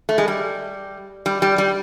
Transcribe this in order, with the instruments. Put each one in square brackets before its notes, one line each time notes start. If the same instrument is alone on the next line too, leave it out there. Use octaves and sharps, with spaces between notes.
[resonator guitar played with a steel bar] A3
G#3
G3
G3
G3
G3